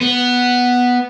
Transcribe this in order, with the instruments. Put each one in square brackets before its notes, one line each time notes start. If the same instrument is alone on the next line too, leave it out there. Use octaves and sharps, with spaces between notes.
[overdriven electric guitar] B3